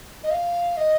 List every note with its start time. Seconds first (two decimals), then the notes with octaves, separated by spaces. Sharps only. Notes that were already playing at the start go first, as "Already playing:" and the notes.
0.23 D#5
0.31 F5
0.77 D#5